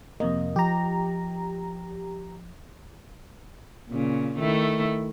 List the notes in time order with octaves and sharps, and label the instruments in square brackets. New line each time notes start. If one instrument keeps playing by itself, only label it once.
[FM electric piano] F2 C3 A#3 [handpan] D#5
[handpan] F3 [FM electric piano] G4 A#5
[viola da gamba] A#2 C#3
D#3 A3 E4